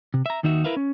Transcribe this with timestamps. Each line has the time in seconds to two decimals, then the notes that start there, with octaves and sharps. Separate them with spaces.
0.14 C3
0.26 E5 A#5
0.43 D#2 D#3 D#4 F#4 E5
0.64 E4 A#4 B4 E5 F5
0.76 C#4